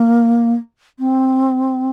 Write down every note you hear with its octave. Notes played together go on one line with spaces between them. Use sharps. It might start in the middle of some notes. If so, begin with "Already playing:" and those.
Already playing: A#3
C4